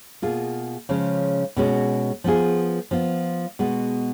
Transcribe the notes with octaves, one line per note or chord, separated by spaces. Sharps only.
B2 A#3 F4 G#4
C#3 F3 G#3 C#4
B2 G#3 C#4 F#4
F3 B3 F4 G#4
F3 B3 F4
B2 G#3 B3 F#4